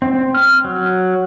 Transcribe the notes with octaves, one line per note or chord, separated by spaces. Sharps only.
C4
F6
F#3